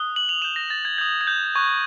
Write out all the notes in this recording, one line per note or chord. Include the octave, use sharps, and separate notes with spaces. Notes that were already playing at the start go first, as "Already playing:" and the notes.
Already playing: D#6 F#6 G7
F#7
F7
D#6 G6 E7
A#6
A6
G#6
D#6 G6 G#6
G#6
G6
C#6 F#6 G#6